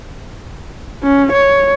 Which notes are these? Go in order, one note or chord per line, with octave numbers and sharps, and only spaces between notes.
C#4
C#5